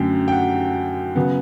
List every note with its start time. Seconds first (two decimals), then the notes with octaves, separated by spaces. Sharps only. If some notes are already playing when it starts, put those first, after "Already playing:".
Already playing: F#2 D3 A3 G5
0.28 G5
0.32 F#5
1.16 C#3 F#3 B3